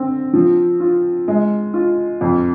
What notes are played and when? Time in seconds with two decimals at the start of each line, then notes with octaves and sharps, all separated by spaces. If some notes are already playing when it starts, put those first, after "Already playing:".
Already playing: D3 C4
0.33 F3
0.80 F4
1.28 G#3
1.74 F4
2.21 F2